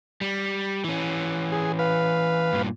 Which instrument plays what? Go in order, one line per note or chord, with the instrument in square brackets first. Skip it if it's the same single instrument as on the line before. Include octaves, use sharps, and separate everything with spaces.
[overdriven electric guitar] G3
E3 C#4
[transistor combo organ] G#4
B4 F5
[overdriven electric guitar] G2 A#2